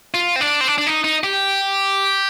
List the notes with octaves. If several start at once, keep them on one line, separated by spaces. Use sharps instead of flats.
F4
C4
D4
C4
D4
D4
D#4
D#4
G4